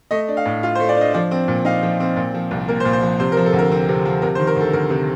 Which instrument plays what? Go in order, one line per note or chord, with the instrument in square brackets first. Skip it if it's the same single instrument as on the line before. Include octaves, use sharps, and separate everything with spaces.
[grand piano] A3 D#5
D4
F5
A2
F4
C5
A3
D5
D4 D#5
F3 D5
C4
A#2
D#4 F5
F3
C4
A#2
F3
C2
A#3 A#4
C5
A#2
C5
F3
C3 C5
F3 A#4
A4
D2
A#4
C4
C3
F3
C3 A#4
C5
D#3
A#4
D2 A4
D2 A#4
C3